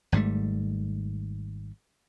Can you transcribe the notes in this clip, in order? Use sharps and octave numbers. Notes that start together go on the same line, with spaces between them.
G#1 G#2 G3 A3